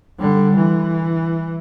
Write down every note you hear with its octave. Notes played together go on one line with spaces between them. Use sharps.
D3 G3
E3